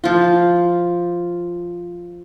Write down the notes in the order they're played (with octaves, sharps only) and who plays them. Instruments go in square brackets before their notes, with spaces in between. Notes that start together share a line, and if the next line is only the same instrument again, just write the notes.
[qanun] F3 F4